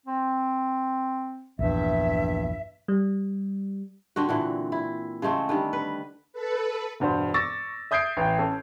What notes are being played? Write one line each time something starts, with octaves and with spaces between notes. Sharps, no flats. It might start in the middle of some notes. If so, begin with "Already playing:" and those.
C4
A#1 E2 G2 E5
G3
D3 C4 F#4
A#2 D3 E3
E4
C#3 G#3 A3 C4
D3 D#3 G3
B4
A4 B4
E1 G2 F#4 C5
C#6 D6 E6 A6 A#6
E5 D#6 G6 G#6 C7 D7
A1 G5
C#4 A4